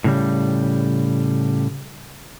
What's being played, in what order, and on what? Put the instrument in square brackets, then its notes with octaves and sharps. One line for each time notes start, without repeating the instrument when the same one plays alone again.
[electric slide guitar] A2 C#3 G3